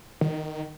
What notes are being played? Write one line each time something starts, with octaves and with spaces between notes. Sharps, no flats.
D#3